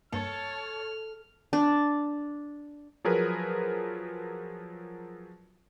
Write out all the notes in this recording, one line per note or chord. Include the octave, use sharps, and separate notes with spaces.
G2 A#3 A4 C#5 A5 F6
D4
F3 F#3 G#4 A#4 B4